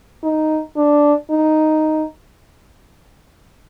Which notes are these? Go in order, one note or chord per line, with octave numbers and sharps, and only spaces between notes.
D#4
D4
D#4